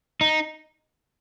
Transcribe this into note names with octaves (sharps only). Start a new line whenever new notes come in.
D#4